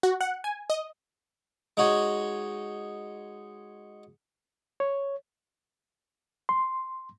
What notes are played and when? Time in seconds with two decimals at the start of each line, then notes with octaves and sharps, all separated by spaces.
0.03 F#4
0.21 F#5
0.44 G#5
0.70 D#5
1.77 G#3 D#4 F#4 C#5
4.80 C#5
6.49 C6